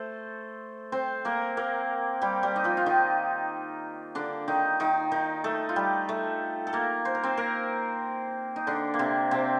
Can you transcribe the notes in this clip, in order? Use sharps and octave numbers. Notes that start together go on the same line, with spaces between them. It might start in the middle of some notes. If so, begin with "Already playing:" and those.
Already playing: A3 A4 C5
C4 C5
A#3 A#4
A#3 A#4
G3 G4
G3 G4
D#4
F3 F4
F4
D#3 D#4
D3 D4
D#3 D#4
D#3 D#4
D#3 D#4
A3 A4
F4
G3 G4
A3 A4
A4
A#3 A#4
C5
A#4
C4 C5
A#3 A#4
D#4
D3 D4
A#3
C3 C4
C3 C4